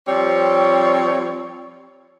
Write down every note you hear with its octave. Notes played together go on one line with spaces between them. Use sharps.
F3 G3 C4 C#5